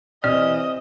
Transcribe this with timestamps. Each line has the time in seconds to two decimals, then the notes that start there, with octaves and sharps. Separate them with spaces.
0.24 C3 E3 C4 D5 D#5 F6